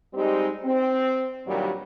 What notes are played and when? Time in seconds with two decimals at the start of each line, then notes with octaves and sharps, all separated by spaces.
0.13 G3 G#3 C4 D#4 G4
0.64 C4
1.47 G2 A#2 D#3 F#3 G3